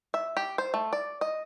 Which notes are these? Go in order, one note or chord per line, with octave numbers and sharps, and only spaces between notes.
E5
G4
C5
A3
D5
D#5